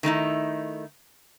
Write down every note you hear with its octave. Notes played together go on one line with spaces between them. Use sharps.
D#3 A3 D#4 E4